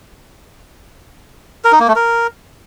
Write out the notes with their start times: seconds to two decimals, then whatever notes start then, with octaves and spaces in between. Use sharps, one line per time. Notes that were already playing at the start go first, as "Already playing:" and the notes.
1.64 A#4
1.72 D#4
1.80 A#3
1.88 A3
1.96 A#4